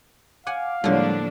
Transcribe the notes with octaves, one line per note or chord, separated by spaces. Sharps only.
F5 F#5 G#5 D6
A2 D3 F3 G3 G#3 A#3 D4